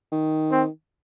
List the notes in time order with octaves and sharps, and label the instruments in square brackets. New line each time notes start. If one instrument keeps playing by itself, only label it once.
[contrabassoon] D#3
[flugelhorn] C4